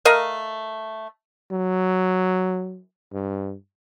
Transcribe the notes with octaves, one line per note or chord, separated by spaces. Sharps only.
A3 A#4 D#5 F5
F#3
G2